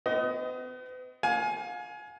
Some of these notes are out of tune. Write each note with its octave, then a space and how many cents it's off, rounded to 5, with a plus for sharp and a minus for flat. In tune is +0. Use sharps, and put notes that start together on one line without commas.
B3 +45 D#5 +15
F5 +35 G#5 +20